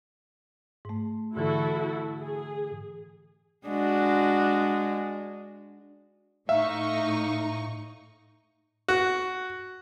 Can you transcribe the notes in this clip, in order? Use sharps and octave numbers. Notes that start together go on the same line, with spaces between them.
G#2 A3
G#2 D3 E3 E4 F#4 A4
G#4
G#3 D4 F#4
A2 D#4 E5 F5 C#6
F#4